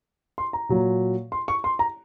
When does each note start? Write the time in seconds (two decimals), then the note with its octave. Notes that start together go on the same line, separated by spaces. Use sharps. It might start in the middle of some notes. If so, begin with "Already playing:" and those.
0.38 C6
0.53 A#5
0.69 A#2 F#3
1.32 C6
1.48 C#6
1.64 C6
1.79 A#5